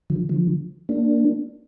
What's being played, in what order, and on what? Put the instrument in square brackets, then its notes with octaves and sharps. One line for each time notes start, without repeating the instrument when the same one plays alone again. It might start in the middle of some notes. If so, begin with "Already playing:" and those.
[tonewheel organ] D3 F3
D3 F3
A#3 D4